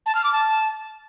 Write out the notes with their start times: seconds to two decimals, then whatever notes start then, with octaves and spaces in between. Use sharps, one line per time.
0.06 A5
0.15 F6
0.24 D6
0.33 A5